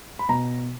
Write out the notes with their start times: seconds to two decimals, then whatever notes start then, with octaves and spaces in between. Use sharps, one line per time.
0.19 B5
0.29 B2 A#5